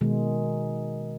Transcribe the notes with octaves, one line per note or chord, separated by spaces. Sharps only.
B2 D#3 G#3